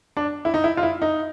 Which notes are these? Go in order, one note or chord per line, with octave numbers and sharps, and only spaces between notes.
D4
E4
D#4
E4
F4
E4
D#4